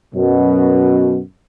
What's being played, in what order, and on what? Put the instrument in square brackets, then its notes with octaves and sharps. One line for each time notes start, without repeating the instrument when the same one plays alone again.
[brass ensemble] F#2 B2